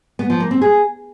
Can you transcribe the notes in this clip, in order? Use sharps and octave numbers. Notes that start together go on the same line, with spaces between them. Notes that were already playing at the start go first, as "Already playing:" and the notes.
B3
F3
A#3
C4
G#4